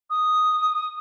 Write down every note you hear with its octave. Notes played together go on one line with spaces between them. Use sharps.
D#6